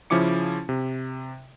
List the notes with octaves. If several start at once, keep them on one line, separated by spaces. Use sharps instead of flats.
C#3 F3 C#4 E4 D6 C#7
C3